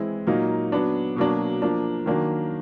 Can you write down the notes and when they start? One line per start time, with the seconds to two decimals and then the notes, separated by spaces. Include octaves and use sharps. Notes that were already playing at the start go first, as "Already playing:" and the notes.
Already playing: E3 G#3 C4 E4
0.27 A#2 F#3 A#3 D#4
0.72 F#3 B3 D4
1.16 B2 F#3 A#3 D4
1.62 F3 A#3 D4
2.06 D#3 F#3 A#3 D4